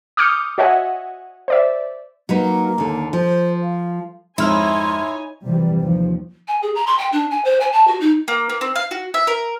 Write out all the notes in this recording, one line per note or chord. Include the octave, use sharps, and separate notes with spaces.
D6 D#6 F6 G6 C#7
F#4 C#5 D#5 E5 F#5 G#5
C5 D5 E5
F#3 A#3 D#4 B4
D#2 D3
F3 C5
F5
F2 G#2 D#4 E4 C#5 G#5 C6 F6
C3 E3 F3 G3
D#2 F3
G#5
G#4
A#5
C6
G5
D4
G#5
C5
G#5
A5
F#4
D#4
A#3
A#3
C4
F5
F#4
E5
A#4